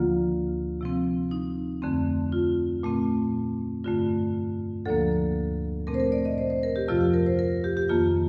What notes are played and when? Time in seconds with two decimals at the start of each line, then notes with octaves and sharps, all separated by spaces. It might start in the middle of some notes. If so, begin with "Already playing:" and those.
Already playing: D2 D3 F3 A#3 F4
0.81 C3 F3 C4
1.31 D#4
1.82 F2 D3 A3 C4
2.32 F4
2.83 A#2 A3 C4
3.84 G2 D3 A3 F4
4.86 D2 D3 F3 A#3 A4
5.87 A#2 A3 C4 A#4
5.94 C5
6.00 A#4
6.12 D5
6.25 D#5
6.38 C5
6.50 C5
6.63 A#4
6.76 G4
6.88 F2 C3 F3 F4
7.01 G4
7.14 A#4
7.26 C5
7.39 A#4
7.64 G4
7.77 G4
7.89 F2 D#3 A#3 F4